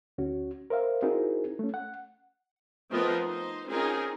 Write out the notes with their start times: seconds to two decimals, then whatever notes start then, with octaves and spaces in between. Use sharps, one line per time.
0.18 D2 C#4 F#4
0.70 A#4 C5 E5 F5
1.02 C4 D#4 E4 F#4 G#4 A#4
1.59 A3 C#4
1.74 F#5
2.91 F3 A3 B3 C4 A#4 D#5
3.25 D#4 C5
3.68 C4 C#4 D#4 F4 G#4 A#4